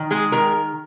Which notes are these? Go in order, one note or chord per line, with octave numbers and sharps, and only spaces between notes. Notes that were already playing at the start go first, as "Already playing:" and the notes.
Already playing: D#3
G#3 G#4
D#3 A#4